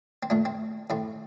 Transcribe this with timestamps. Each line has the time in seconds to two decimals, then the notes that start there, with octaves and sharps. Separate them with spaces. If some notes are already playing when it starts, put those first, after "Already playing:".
0.23 C4
0.30 A#2 A3 D4
0.45 C4
0.90 A2 A3 C4